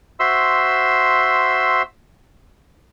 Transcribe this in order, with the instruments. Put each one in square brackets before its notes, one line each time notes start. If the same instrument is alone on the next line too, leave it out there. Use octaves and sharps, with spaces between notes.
[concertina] F#4 C5 E5 C6 E6